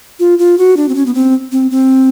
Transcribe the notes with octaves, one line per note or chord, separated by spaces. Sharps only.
F4
F4
F#4
D4
C4
C#4
B3
C4
C4
C4